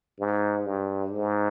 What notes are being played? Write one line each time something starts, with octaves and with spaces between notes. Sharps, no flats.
G#2
G2
G#2